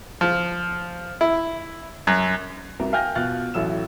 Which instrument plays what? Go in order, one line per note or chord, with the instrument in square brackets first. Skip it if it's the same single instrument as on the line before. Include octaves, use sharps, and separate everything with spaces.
[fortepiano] F3
E4
F#2
[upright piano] C2 C3 F#4 A#4
F5 G5 G#5 F6 G6 A#6
B2 F4 F5 F6 F#6 A6
A1 A2 F#3 E6 E7